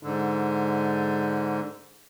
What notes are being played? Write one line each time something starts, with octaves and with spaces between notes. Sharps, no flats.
G#2 D3